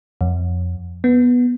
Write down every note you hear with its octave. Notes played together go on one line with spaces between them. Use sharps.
F2
B3